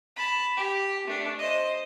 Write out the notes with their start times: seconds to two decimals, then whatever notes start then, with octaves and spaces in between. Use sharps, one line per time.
0.16 A5 B5
0.57 G4
1.07 A3 D4
1.39 C5 D#5